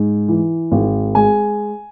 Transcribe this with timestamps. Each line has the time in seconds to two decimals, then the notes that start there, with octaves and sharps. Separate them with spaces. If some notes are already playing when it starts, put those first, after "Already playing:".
Already playing: G#2
0.28 E3
0.72 G#1
1.15 G#3 G#5